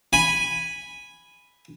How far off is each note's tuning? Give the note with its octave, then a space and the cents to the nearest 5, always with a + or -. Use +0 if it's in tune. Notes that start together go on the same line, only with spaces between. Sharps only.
G#5 -5 B5 +0